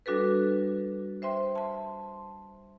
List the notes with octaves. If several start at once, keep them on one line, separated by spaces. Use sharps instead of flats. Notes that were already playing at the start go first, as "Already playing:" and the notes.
G3 D4 F#4 A4 B4
C5 E5 G5 C6
A5 C6